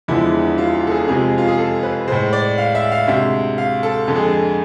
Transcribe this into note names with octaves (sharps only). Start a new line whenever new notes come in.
E2 D3 F3 G#3 E4
F4
F4
A4
G#4
F2 C3 F3 G#3 G#4
F4
G#4
A4
B4
A2 G#3 C5
D5
F5
E5
F5
D2 C3 G#3 E5
F5
A4
F2 D3 G#3 A4
G#4
A4